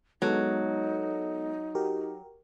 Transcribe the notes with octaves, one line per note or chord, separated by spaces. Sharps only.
F#3 G#3 B3 D#4 A4
F#4 G4 A#4